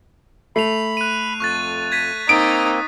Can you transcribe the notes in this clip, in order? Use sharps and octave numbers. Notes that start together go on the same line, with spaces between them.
A3 B5 C7 F7
F#6 D#7
F2 C#6 F#6 A6
G#6 B6 D#7
A#3 C4 D#4 D#6 D7